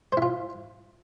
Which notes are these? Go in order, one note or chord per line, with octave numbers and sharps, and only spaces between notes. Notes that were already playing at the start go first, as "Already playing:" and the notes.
E4 F4 C5